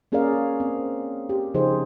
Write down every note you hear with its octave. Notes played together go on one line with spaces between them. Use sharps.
A#3 C#4 G#4 A#4 D5 F5
C4
G4
C#3 F3 D#4 G#4 C5